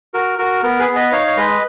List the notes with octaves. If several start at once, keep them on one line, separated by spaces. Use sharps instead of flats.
F#4 A#4
F#4 A#4
B3 A#4
G#4 B4
B3
B4 D#5
D#4 C#5 F5
C#5
G#3 B4 D#5